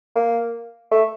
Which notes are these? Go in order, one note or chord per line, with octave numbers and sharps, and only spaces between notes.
A#3
A3